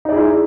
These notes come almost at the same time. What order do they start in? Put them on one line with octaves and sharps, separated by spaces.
D#4 D5 G#4 E4